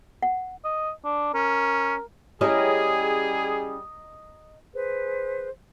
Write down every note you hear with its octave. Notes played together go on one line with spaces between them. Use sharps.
F#5
D#5
D4
C#4 A#4
G3 C#4 E4 G4 G#4 D#5 A#5
G#4 B4 C5